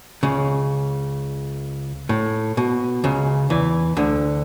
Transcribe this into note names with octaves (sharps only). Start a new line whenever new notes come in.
C#2 C#3
A2
B2
C#2 C#3
E2 E3
D2 D3